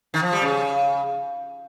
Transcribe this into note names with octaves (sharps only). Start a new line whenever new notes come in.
D#3
F3
G3
C#3